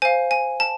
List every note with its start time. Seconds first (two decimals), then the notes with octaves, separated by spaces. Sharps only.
0.02 C5 F5 G#5
0.31 G#5
0.60 A5